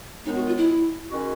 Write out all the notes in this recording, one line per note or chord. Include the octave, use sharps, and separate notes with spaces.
F#2 D#3 G#3 B3 D#4
F#4
F4
E4
D#3 G#3 C#4 F#4